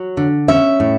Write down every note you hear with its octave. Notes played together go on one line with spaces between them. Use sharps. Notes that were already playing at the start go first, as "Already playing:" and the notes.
Already playing: F#3
D3
C#4 E5
A2